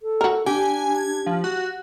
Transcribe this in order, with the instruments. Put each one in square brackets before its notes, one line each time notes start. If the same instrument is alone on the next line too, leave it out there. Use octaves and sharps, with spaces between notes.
[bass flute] A4
[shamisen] F#4 A#4
[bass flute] D4 [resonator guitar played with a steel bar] G4 [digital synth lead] G#5
[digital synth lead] G#6
F3
F#4